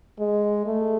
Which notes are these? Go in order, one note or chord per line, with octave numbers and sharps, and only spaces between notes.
G#3
A3